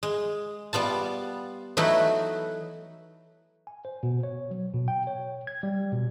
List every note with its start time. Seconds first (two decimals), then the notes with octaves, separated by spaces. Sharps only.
0.03 G#3
0.73 G3 B3 F4 A5
1.77 E3 F#3 A3 D#4 F#4 B4
3.67 G#5
3.85 C5
4.03 B2
4.23 C#5
4.51 F#3
4.74 B2
4.88 G5
5.07 C#5
5.47 G#6
5.63 G3
5.92 B2